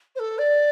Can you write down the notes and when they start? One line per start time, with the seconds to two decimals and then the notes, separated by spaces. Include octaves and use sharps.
0.15 C5
0.19 A4
0.38 D5